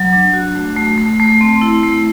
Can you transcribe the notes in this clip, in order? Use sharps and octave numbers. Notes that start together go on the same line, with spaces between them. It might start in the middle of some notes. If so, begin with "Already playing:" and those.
Already playing: F#3
D4
F#4
A3
A3
A3
A3
C4
E4
A3